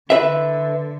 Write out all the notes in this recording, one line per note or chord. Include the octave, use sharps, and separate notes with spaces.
D3 B4 E5